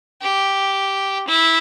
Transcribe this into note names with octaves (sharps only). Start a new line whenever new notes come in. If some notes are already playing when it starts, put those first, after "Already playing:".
G4
E4